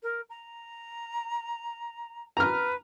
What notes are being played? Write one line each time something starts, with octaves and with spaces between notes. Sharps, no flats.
A#4
A#5
B4 A#5 F6